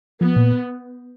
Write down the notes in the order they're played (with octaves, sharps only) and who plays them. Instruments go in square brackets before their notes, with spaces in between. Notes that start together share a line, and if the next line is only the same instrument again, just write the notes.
[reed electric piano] F3 [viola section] B3
[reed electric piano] A#2